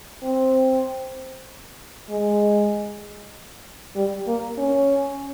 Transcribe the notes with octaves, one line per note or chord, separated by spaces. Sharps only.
C4
G#3
G3
A#3
C#4